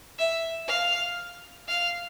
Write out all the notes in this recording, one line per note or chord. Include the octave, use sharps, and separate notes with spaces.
E5
F5
F5